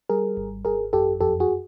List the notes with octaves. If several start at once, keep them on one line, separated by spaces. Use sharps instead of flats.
G3 G#4 A#4
G#1
G#1 G#4 A#4
F#2 G4 A4
F2 G4 A4
F#4 G#4